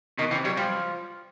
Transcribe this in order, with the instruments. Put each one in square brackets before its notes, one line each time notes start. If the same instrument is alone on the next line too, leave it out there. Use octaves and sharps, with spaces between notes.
[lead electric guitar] B2 [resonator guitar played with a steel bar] D#3
[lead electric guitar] C3 [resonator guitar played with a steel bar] E3
[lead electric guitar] F#3 [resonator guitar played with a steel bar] G3
[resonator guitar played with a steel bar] F3 [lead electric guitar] G3